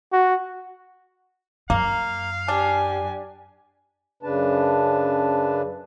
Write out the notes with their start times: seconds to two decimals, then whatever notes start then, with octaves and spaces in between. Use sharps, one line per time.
0.13 F#4
1.70 F#2 A#3 F5
2.48 D4 G4 G#5
4.23 F#2 C#3 D4 B4 A5